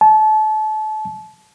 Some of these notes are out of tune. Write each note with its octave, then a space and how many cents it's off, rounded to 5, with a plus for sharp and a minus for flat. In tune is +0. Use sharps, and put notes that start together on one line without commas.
A5 -30